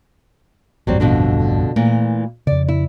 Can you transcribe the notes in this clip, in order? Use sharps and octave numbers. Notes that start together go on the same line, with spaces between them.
A1 E2 G2 F#3 G3 C4
F2 B2 D3
A#2 E3 A3
F2 C#3 D5
E4